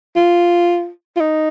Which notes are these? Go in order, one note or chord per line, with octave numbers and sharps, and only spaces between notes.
F4
F4
D#4